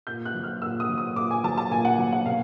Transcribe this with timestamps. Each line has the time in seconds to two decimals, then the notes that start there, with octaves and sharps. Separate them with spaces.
0.07 A#2 G6
0.25 F#6
0.35 F#3
0.43 F6
0.62 A#2 E6
0.80 D#6
0.89 F#3
0.98 D#6
1.16 A#2 D6
1.31 G#5
1.44 F#3 A5
1.58 A5
1.71 A#2 G#5
1.85 F#5
1.98 F#3
2.12 F#5
2.26 B2 F5